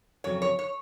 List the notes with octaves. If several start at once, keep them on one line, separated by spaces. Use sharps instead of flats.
F2 C#3 F#3 C#5
C#5
C#5